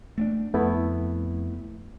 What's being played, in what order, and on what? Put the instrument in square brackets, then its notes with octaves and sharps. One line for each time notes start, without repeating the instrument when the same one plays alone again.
[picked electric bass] A3 C4 D4
[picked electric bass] F2 [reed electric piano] A3 B3 E4